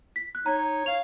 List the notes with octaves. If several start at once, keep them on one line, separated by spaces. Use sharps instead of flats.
B6
F#6
D#4 C#5 A#5
C#5 F5 F7